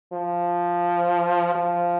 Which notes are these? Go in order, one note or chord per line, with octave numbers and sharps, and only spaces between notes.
F3
F3